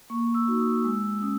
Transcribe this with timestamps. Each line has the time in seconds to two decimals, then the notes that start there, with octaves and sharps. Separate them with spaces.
0.10 A#3 C#6
0.34 E6
0.48 D#4 F#4
0.60 D#6
0.84 G#3 E6
1.22 C#4 D#6